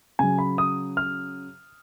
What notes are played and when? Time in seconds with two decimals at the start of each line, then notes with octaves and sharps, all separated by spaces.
0.19 C#3 F#3 G#5
0.38 B5
0.58 D#6
0.97 F6